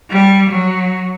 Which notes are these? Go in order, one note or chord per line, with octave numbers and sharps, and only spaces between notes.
G3
F#3